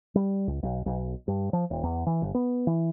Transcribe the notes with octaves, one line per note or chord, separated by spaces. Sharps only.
G3
C#2
B1
B1
G2
F3
D#1
E2
E3
G1
B3
E3